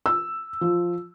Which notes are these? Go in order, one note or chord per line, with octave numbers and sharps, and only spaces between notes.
E6
F3